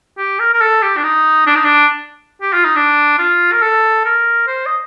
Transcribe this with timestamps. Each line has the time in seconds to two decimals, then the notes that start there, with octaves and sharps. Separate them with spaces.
0.18 G4
0.40 A#4
0.53 A#4
0.61 A4
0.82 G4
0.97 D4
1.04 D#4
1.47 D4
1.56 D#4
1.64 D4
2.42 G4
2.53 F4
2.64 D#4
2.76 D4
3.18 F4
3.52 A#4
3.62 A4
4.05 A#4
4.47 C5
4.66 D#5